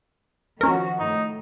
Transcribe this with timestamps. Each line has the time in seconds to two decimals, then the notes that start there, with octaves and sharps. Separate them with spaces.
0.61 D#3 F3 C#4 F#4 A#4
0.99 A2 D#4